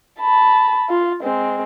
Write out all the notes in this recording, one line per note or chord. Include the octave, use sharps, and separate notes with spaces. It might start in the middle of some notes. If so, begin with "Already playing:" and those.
A5 B5
F4
G#3 C4